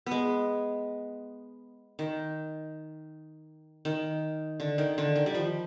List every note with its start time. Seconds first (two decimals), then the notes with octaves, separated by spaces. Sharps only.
0.06 G#3 B3
1.99 D#3
3.85 D#3
4.60 D3
4.78 D#3
4.98 D3
5.16 D#3
5.26 G3
5.35 F3